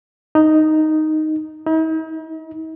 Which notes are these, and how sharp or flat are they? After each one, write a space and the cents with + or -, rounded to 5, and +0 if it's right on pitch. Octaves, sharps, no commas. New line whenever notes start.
D#4 +0
D#4 +45